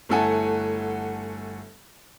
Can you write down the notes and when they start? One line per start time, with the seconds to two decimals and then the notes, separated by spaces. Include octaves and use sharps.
0.09 G1 A3 E4 A4 F#5 G#5